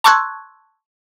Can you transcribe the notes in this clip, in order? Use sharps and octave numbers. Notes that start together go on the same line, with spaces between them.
A5 C6 C#6 E6 F#6 G#6